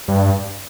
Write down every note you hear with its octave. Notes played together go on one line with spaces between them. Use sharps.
G2